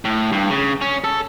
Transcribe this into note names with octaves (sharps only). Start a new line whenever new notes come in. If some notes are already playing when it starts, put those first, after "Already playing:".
A2
G2
C#3
C#4
A4